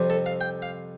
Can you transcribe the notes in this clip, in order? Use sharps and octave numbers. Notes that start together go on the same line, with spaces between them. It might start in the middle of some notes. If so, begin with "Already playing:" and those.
Already playing: F2 C3 G3 C4
A4
F5
G5
F5